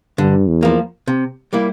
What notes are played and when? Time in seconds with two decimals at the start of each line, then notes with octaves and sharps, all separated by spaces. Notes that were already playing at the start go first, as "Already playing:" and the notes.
0.18 G2 D3
0.48 E2
0.63 F3 A#3
1.08 C3
1.53 G3 A#3 E4